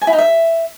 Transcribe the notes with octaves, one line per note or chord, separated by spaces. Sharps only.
G#5
E4
D#4
E5